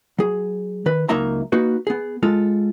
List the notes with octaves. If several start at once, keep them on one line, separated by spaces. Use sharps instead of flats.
F#3 G#4
D#3 B4
C#2 F#3 A#3 D#4 E5 A#5
A#3 D#4 F#4 B4
B3 G#4
G#3 F4 A4